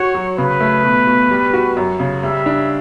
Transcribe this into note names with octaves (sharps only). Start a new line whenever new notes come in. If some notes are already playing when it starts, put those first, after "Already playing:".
Already playing: F#4 C#5
F#3
C#3 B4
A3
B2
B2
G3
F#4
F#2
C#3
G3 E5
D4